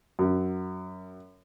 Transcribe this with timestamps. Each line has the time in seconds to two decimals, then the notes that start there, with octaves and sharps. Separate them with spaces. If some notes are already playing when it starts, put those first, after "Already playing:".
0.19 F#2